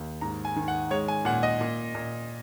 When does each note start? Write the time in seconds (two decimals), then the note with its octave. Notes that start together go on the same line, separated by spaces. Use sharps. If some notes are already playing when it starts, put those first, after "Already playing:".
Already playing: D#2
0.21 G#2 A#5
0.45 G#5
0.56 D#3
0.68 F#5
0.91 G#3 C#5
1.08 G#5
1.25 A#2 F#5
1.43 D#5
1.61 A#2
1.95 A#2